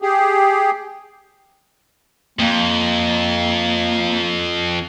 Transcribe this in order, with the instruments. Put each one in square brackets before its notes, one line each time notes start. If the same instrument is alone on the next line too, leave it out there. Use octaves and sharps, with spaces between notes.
[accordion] G4 G#4
[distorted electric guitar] F2 [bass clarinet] A#3